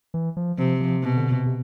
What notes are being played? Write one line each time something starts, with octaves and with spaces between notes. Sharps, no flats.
E3
F3
C3 F3
F3
B2
D3
C3
C3